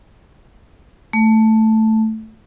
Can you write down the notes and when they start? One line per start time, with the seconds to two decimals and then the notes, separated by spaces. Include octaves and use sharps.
1.13 A3